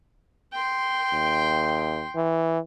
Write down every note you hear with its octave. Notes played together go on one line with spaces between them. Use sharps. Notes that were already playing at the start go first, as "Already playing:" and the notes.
G5 C6
D#2
E3